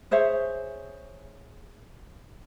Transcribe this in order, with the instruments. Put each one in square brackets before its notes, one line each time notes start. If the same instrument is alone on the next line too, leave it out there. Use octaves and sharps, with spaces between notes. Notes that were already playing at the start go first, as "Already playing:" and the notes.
[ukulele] G#4 C5 C#5 E5